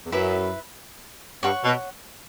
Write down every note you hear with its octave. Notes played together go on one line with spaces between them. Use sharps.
E2
F#2 E4 B4 E5
G2 C#5 F#5 C#6
B2